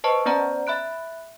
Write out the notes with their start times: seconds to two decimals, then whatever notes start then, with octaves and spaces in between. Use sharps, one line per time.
0.04 B4 C5 D#5 A5 C#6
0.26 B3 C#4 C5 D5 A#5
0.67 E5 B5 F#6 D7